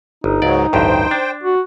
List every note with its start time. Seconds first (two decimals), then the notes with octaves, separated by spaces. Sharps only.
0.24 G1 D#4
0.42 C#2 G#2 F#3 D5
0.73 A1 D2 G2 C5 G5
1.11 D4
1.43 F#4